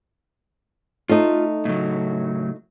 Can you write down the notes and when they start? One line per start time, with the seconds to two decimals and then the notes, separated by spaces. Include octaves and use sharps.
1.09 A3 D#4 F4
1.65 A2 C#3 F#3